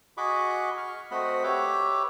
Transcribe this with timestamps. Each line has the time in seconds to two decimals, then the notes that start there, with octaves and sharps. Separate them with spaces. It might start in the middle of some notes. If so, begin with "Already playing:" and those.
0.17 F#4 G#4 D#5 B5 C#6 D6
0.77 C#6 F6
1.11 A3 C4 F#4 D#5 F#5 B5
1.44 G4 B4 C#5 E5 D6